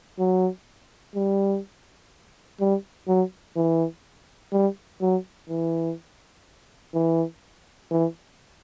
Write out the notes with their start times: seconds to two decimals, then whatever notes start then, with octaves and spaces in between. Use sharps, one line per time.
0.19 F#3
1.15 G3
2.60 G3
3.08 F#3
3.56 E3
4.52 G3
5.01 F#3
5.49 E3
6.94 E3
7.91 E3